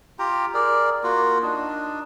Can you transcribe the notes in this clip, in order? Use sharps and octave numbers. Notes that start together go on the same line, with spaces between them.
F4 G4 G5 A#5
G#4 A#4 D5
A#3 F4 F#4
D4 D#4